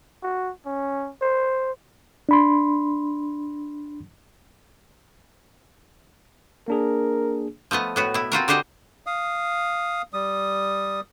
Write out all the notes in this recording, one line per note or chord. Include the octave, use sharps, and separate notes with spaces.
F#4
C#4
C5
D4 B5 C6
A#3 D4 G#4 A#4
F3 A3 B3 D#5
A2 B3 F#4
B2 E4
C4 F4 F#4 A#4
D3 F#4 G4 C5 D#5
F5 D#6
G3 D#6